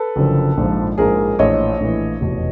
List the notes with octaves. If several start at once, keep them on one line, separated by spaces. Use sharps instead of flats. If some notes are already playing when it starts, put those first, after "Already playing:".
Already playing: A4 B4
F#1 F#2 D3 F3
A#1 G#2 F3
A#1 G#2 F3 G#4 A#4
A#1 A2 E3 C#5 D#5
A#1 A2 E3
F1 E2 B2